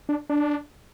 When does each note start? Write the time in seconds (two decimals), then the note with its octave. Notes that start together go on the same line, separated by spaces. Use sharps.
0.09 D4
0.30 D4